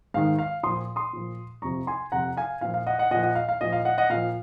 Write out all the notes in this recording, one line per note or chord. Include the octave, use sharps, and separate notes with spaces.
G#2 D#3 F5
F5
A#2 F3 C6 D#6
C6 D#6
A#2 F3
F2 C3 F3 A#5 C#6
G#5 C6
F2 C3 F3 F#5 A#5
F5 G#5
A#2 F3 F5
F5
D#5 F#5
D#5 F#5
A#2 F3 D#5 F#5
D#5 F#5
F5
F5
A#2 F3 D#5
F5
D#5 F#5
D#5 F#5
A#2 F3 F5